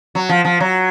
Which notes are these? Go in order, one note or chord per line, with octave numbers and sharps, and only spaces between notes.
F#3
F3
F3
F#3